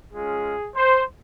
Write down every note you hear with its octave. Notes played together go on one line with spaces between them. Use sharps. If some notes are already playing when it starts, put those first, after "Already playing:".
G#3 C#4 F4 G#4
C5